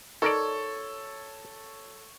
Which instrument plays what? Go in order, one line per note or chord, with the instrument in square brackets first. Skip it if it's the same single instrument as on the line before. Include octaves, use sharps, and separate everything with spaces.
[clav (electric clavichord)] D#4 A#4 D5 [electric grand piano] A4 [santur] C#5